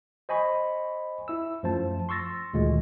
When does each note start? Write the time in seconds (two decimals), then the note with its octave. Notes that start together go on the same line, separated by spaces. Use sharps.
0.29 C5 D#5 G#5 B5 C#6
1.28 E4 E6
1.63 F#2 F3 A3 C5 A5
2.09 C6 C#6 E6 A6 A#6
2.53 D2 A#2 D#3 G#3